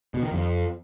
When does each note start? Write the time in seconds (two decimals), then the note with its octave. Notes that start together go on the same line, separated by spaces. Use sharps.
0.14 B2
0.23 D#3
0.31 F2